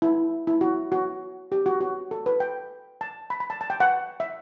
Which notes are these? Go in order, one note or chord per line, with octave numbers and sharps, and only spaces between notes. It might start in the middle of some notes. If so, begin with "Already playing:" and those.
E4
E4
F#4
F#4
G4
F#4
F#4
A4
B4
G5
A5
B5
B5
A5
A5
G5
F#5
E5